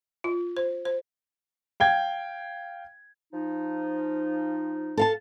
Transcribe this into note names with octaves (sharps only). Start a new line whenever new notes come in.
F4
C5
C5
F5 G5 G#6
F3 D#4
A4 F5 A5